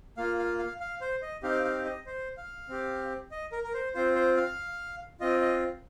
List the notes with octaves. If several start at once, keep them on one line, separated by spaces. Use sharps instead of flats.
A#3 F4 F5
F5
F5
F5
C5
D#5
C4 D#4 G4 F5
F5
D#5
C5
F5
C4 G4
D#5
A#4
A#4
C5
C4 F4 C5
C5
F5
C4 F4 D#5
D#5